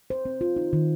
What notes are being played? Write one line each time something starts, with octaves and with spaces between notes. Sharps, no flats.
C5
C4
F4
D#4
D#3